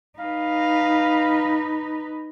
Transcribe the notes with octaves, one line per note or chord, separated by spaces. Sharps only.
D#4 B4 F5